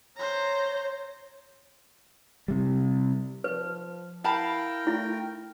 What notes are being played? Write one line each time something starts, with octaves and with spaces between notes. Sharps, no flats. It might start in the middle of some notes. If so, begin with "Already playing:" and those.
C5 C#5 A#5
C3 G3
F3 B4
E4 A#4 F5 G5 A5 B5
A3 E4